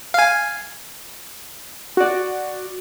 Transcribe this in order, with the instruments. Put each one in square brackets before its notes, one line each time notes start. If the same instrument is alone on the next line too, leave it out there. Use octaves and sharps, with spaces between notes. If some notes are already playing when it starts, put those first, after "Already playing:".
[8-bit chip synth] F5 G#5
[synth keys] F#4 D5